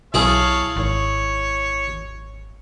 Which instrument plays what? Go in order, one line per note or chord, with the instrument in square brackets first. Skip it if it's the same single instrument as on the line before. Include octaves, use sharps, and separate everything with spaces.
[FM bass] B1 [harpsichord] E4 G#4 [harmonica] C#5 F5 A5
[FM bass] G#1 [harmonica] C#5